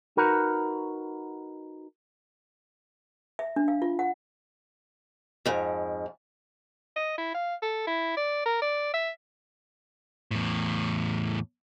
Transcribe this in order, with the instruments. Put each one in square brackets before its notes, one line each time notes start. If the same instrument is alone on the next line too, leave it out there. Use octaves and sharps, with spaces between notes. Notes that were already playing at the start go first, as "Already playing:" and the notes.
[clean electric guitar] D#4 F#4 A#4 B4
[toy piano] E5
D4
F5
F4
F#5
[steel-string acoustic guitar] F2 G#2
[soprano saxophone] D#5
E4
F5
A4
E4
D5
A#4
D5
E5
[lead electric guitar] E2 A2